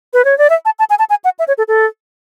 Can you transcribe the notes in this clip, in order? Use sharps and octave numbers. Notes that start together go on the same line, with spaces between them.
B4
C#5
D5
E5
A5
A5
G#5
A5
G#5
F#5
E5
C#5
A4
A4